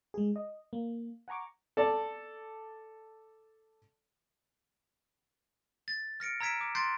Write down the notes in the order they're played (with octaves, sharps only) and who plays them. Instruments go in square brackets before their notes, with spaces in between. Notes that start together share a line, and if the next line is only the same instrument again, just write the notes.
[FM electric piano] G#3 G#4
D#5
A#3
F#5 G#5 A#5 C#6 D6
[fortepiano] A4 D5 A5
[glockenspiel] A6
F6 A#6 C#7 D7
A#5 E6 G#6 B6 D7 E7
D6
C6 F#6 G6 A6 C7 D7